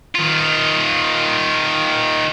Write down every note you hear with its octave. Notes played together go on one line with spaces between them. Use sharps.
D#3 F4